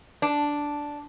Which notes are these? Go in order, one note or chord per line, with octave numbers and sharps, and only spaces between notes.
D4